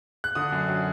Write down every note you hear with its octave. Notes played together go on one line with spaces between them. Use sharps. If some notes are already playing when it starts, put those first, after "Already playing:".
F#6
D3 D#6
F#2
F#3